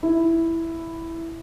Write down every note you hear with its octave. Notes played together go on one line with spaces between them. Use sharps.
E4